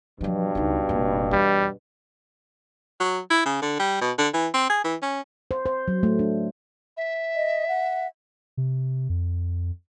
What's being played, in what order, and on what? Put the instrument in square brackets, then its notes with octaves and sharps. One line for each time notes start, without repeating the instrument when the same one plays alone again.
[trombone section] G2 B2 [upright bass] F3 F#3
[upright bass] C#2 D#4
F1 A#2
[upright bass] E2 [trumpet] G3
[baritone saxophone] F#3
E4
C#3
D3
G3
B2
D3
E3
C4
G#4
E3
C#4
[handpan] C5
C5
F#3
A3
D4
[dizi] E5
[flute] D#5
F#5
[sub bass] C3
F2